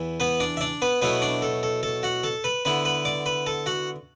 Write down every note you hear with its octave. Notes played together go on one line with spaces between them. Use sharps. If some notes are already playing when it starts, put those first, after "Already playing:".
Already playing: E2 E3 E4
B3 B4
D4 D5
E5
D4 D5
B3 B4
B2 F#3 A3 B3 E4 B4
D4 D5
A4
A4
A4 A5
F#4 F#5
A4 A5
B4 B5
D3 B3 E4 B4 B5
B4 B5
D5 D6
B4 B5
A4 A5
F#4 F#5